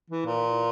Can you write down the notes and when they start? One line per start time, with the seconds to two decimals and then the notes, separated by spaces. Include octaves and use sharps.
0.10 E3
0.25 A#2